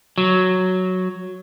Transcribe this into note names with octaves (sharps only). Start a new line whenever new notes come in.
F#3